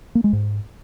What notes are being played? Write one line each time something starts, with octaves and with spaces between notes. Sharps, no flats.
A#3
G#3
G#2